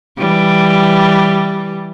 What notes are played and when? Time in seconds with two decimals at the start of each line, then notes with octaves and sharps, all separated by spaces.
0.18 E3 G3